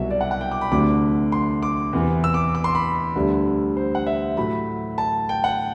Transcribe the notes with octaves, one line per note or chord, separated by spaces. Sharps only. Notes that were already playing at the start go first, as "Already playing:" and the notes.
Already playing: C2 B2 F#3 E5
D5
F#5
F#5
G5
D6
B5
D2 C3 F#3 A3 D4 D6
C6
D6
E2 C3 E3 B3
E6
D6
D6
C6
B5
D2 D3 G3 B3
C5
F#5
E5
A2 F#3 A3 B5
A5
G5
F#5